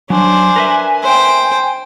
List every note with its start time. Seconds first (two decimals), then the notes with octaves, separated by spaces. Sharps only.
0.10 F#3 D4 C5 G#5
0.56 A#4 B4 E5
1.03 C5 G5